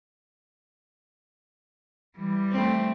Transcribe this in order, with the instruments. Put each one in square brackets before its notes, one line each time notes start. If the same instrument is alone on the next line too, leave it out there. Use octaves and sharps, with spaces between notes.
[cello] E3 G3
[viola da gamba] A3 C4